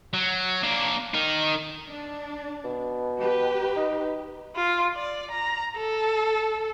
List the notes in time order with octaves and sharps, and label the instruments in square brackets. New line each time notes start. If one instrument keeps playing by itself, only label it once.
[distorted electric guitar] F#3
A#3 D4
D#4 A#4
[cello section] D4
[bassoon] B2
[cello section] G4 B4
[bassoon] D#4
[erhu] F4
D5
A#5
A4